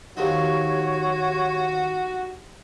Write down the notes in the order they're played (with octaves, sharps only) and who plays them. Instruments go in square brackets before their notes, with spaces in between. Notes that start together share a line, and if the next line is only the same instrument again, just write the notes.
[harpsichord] D#2 F3 F#3 [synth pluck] D#4 G4 [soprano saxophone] F#4 [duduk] C#5